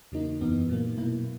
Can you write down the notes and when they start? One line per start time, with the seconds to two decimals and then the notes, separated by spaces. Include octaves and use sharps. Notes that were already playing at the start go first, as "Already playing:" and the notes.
0.12 E2 C#3 F#3 A#3 D#4
0.41 F#2 E3 B3 D#4
0.69 A#2 F#3 A#3
0.98 B2 A#3 E4